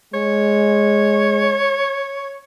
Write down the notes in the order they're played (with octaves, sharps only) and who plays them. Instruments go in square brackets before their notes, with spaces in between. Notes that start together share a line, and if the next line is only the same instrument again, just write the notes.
[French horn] G#3 [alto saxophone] C#5